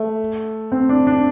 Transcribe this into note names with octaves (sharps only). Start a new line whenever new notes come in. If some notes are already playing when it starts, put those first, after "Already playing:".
Already playing: A3
C4
D4
D4